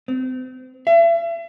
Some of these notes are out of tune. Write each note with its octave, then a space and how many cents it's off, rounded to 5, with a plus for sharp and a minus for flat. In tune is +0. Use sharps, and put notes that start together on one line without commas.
C4 -35
E5 +40